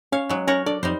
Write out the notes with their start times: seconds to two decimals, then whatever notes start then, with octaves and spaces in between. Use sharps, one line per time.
0.12 C#4 C#5 F5
0.29 F#3 G#3
0.48 C#4 A#4 C#5 F#5
0.66 D4 A4 D5
0.83 F2 G3 D#4 C5